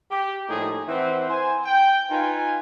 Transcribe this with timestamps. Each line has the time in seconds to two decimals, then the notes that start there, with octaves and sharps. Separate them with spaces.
0.11 G4
0.49 A2 F3 G3 A#3 D#4 G#4
0.88 E3 C4 C5 E5 F#5
1.29 C5 G#5
1.65 G5
2.10 D#4 F4 B4 F5 G#5